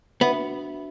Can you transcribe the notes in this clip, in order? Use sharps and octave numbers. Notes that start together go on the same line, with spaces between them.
B3 D4 F#4 B4 E5